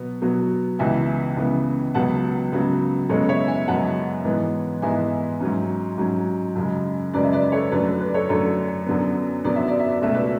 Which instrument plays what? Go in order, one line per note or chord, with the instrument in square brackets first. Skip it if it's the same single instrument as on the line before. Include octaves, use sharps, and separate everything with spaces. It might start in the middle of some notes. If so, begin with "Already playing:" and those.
Already playing: [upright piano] B2 F#3 B3
B2 F#3 B3
C#2 C#3 E3 B3 E5 G#5
C#2 C#3 E3 B3
C#2 C#3 F#3 B3 F#5 A5
C#2 C#3 F#3 B3 B4
F#2 C#3 G#3 B3 A4 C#5
C#5 E5
E5 G#5
F#2 C#3 G#3 B3 F#5 A5
G#2 E3 G#3 B3
G#2 E3 G#3 B3 E5 G#5
G#2 F#3 C#4
G#2 F#3 C#4
F#2 C#3 G#3
F#2 C#3 G#3 B4 D5
E5
B4 D5
D5
A4 C#5
F#2 D3 A3 B4 D5
B4
B4
D5
A4 C#5
F#2 D3 A3 A4 C#5
F#2 D3 F#3 B3
F#2 D3 F#3 B3 D5
E5
D5
E5
D5
C#2 B2 A3 C#4 E5
B4 D5